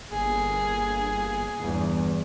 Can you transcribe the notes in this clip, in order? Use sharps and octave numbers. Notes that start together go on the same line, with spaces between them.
G1 A#3 G#4
G1 E2